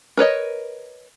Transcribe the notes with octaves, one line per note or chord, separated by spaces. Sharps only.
A#4 B4 C#5 D#5